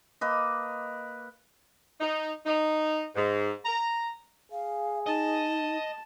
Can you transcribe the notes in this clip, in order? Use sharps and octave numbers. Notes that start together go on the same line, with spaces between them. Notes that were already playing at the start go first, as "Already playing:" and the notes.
A#3 B4 D#5
D#4
D#4
G#2
A#5
G#4 F5
D#4 D#5 A5